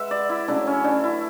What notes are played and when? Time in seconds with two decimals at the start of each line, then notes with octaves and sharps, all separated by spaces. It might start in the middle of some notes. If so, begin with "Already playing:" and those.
Already playing: G#3 B4 E5 F#5
0.11 D5
0.29 E4
0.48 C#3 F#3 A3 D4
0.67 C#4
0.84 D4
1.04 E4